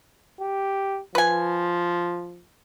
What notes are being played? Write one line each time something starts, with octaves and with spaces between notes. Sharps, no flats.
G4
F3 B4 G#5